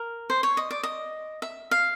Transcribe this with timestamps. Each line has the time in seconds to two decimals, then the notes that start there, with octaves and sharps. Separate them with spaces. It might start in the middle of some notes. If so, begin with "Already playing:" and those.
Already playing: A#4
0.30 C5
0.43 C#5
0.57 D#5
0.71 D5
0.83 D#5
1.42 E5
1.71 F5